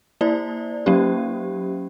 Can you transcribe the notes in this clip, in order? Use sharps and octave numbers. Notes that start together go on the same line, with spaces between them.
A#3 E4 C5 D5
F#3 A#3 C#4 G4